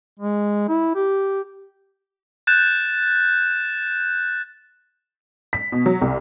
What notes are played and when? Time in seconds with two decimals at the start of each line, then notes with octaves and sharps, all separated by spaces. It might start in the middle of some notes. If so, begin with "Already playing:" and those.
0.20 G#3
0.69 E4
0.95 G4
2.47 F#6 G6 A6 E7
5.53 B6
5.72 B2
5.86 F#3
6.01 C2